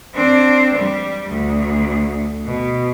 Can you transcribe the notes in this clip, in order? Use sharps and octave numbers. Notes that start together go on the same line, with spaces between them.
C4 D4
G3
D2
B2